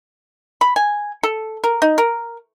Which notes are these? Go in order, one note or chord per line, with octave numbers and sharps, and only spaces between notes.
B5
G#5
A4
A#4
D#4
A#4